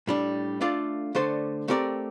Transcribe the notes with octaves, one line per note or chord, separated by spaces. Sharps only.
A2 G3 D4
A3 D4 F4 A4 D5
D3 A3 D4 A4 C5
A3 C4 G4 A#4 D5